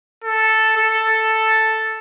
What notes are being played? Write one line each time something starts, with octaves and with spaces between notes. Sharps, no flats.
A4
A4